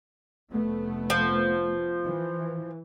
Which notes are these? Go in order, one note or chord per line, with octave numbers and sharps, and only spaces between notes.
F1 A3 B3
F3
E3